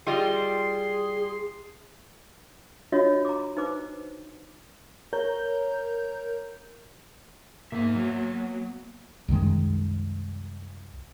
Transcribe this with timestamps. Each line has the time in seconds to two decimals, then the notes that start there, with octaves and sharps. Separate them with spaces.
0.07 G3 F4 G#4 D#5 C6
2.92 D4 F4 F#4 C#5 D#5
3.25 A#5 D6
3.57 D#4 B4 C5 D6
5.13 A#4 C#5 A#5 G6
7.72 G#2 A#3 B3 E5
7.95 F#3
9.28 C2 F#2 D#3 G#3